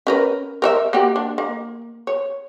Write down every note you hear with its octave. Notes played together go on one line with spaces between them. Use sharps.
C#4 A#4 B4
A#4 C#5 E5
A#3 F#4 G4
D4
A#3
C#5